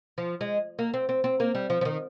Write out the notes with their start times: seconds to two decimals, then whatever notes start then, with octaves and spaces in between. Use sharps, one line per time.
0.18 F3
0.41 G#3
0.79 A#3
0.94 C4
1.09 C4
1.24 C4
1.40 A#3
1.55 G3
1.70 F3
1.81 F3
1.85 D#3